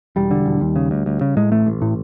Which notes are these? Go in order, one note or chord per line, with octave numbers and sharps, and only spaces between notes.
E1 G3
D3
E1
D#2
C#3
D2
D2
C#3
A2 G#3
A1 A3
A1
A2